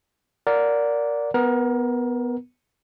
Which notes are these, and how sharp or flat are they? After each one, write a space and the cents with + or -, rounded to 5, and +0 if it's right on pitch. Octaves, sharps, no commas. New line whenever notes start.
A#4 +0 D5 -15 F#5 -20
B3 +0 A#4 +25